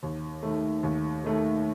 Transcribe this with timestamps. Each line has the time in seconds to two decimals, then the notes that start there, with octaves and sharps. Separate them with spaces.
0.03 D#2
0.43 D#3 A3
0.83 D#2
1.24 D#3 A3